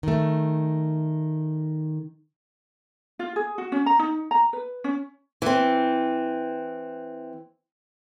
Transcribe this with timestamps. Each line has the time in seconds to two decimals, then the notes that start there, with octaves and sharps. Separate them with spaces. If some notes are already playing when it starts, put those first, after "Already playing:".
0.03 D#3 A3
3.19 F4
3.36 G#4
3.58 F#4
3.72 C#4
3.86 A#5
3.99 D#4
4.31 A#5
4.53 B4
4.84 C#4
5.42 E3 C4